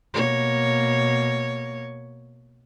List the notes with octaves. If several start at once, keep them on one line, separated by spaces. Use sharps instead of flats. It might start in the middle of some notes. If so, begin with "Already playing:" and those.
B2 A#3 C#5